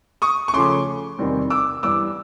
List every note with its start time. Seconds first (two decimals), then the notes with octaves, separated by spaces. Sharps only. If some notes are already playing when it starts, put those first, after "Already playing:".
0.22 C#6 D#6
0.48 C#6
0.53 C#3 F3 A3 C#4 C6 D6
1.19 E2 C3 D#3 G3 C4
1.50 D6 E6
1.83 G2 E3 G3 B3 D4 D6 E6